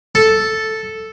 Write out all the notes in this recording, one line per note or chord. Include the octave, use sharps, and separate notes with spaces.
A4